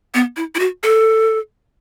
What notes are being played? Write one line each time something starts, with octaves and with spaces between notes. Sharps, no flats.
B3
E4
E4
F#4
A4